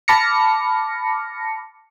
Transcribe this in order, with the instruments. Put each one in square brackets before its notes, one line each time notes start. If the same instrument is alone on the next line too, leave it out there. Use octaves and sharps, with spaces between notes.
[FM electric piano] A5 B5 D6 F6 A#6 C#7